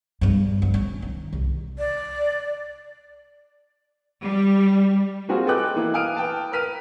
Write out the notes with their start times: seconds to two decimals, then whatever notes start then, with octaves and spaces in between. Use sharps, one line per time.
0.21 G2 G3
0.62 D2
0.74 C#4
1.02 D#3
1.33 C2
1.78 D5
4.23 G3
5.29 G3 A#3 C4 F4 F#4 G#4
5.47 A4 B4 D#5 G5 D6 F#6
5.76 E3 A#3 B3
5.94 F5 G#5 D#6 F6 D7 D#7
6.17 B4 G5 A5
6.52 A#4 B4 F6 B6 D#7